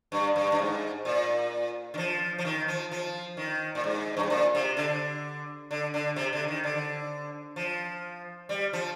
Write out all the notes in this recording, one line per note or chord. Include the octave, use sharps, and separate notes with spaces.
G2
G2
G2
G#2
A#2
D#3
F3
F3
D#3
F3
F3
D#3
A#2
G#2
G2
G#2
A#2
C3
D3
D3
D3
C3
D3
D#3
D3
F3
G3
F3